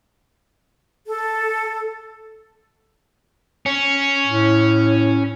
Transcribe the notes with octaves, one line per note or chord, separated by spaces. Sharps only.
A4
C#4
A2